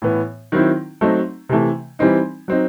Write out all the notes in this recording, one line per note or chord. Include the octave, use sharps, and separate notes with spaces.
A2 E3 B3
D#3 F#3 C4 E4
F#3 A3 C4 D#4
C3 E3 A3
E3 G3 C4 D#4
F#3 C4 D#4